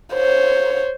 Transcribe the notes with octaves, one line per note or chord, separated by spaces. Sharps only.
C5 C#5